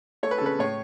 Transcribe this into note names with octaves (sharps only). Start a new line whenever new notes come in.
A3 C#5
B4
A4
C#3 B4
A2 C#5